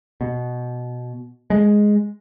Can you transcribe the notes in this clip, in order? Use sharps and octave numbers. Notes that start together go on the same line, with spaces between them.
B2
G#3